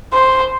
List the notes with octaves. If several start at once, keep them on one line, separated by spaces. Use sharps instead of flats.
C5